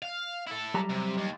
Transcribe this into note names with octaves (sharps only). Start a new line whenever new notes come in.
F5
E4 A4
F#3 G3 A#5
C3
D#2